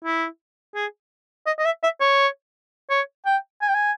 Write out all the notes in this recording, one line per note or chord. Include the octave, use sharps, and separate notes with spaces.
E4
G#4
D#5
D#5
E5
E5
C#5
C#5
G5
G#5
G5
G#5